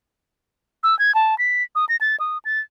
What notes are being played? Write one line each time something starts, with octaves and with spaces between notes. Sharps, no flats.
E6
G#6
A5
B6
D#6
A#6
A6
D#6
A6